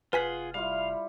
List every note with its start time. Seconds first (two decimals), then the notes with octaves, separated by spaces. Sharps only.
0.13 F1 F4 G#4 B4 F#5 G#5 B6
0.54 G3 E4 F4 F5